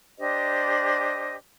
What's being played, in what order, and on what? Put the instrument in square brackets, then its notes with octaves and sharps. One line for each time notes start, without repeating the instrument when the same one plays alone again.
[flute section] D4 G4 C5 D#5